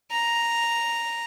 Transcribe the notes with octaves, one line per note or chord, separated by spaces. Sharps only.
A#5